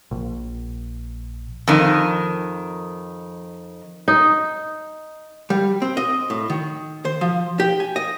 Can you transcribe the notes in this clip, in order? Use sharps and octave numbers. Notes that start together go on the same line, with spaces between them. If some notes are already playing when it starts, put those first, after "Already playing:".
A#1
F2 D#3
D#4
G3
C4
D#5
A2
D#3
C5
F3
G4
G#5
D#5